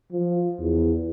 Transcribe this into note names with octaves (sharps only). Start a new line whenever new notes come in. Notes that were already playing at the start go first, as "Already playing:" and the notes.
F3
E2